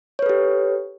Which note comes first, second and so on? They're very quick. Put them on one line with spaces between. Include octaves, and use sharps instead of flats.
C#5 B4 A4 G4